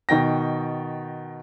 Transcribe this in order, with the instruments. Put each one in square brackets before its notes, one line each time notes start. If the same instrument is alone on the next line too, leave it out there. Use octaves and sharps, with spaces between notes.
[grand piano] B2 D#3 G5 A#6